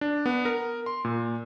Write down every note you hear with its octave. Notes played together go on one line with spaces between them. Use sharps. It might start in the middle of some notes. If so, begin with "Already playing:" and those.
D4
B3
A#4
C6
A#2